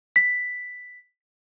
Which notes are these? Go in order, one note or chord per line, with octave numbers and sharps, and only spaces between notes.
B6